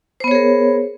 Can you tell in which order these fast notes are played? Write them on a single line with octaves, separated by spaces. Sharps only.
C5 B3 C#5 G#4 A#4